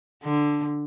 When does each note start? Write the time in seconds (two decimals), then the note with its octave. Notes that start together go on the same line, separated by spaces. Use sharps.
0.24 D3